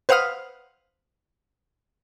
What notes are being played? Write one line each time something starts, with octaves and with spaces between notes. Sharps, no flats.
B4 C5 F5 F#5 D#6 F6